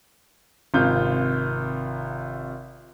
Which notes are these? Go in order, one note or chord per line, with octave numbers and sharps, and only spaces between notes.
G#1 C3 F4 G6